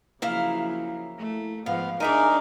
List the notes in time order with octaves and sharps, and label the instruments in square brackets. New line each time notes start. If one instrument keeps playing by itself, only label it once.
[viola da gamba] C#3 F3 F#3 [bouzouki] A#3 E4 F5
[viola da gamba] A3
[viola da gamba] G#2 F3 [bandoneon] B3 [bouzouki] F5
[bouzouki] G#3 E5 G#5 [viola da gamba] D4 D5 [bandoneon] D#4 A#4